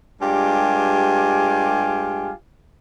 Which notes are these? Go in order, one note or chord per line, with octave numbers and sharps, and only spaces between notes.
G2 G#3 F4 G4 G#5